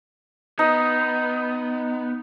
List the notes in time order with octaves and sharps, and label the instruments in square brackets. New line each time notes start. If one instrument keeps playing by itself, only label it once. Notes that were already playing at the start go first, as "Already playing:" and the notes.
[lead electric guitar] B3 [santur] D#4